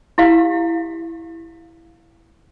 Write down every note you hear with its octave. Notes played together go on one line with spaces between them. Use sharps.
E4 G4 F5